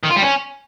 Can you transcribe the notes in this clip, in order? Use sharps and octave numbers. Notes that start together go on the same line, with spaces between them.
D#3
F4
G3
C#4